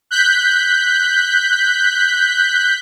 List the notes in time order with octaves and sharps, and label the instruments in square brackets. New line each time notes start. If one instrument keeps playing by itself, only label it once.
[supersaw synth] F#6 G6 B6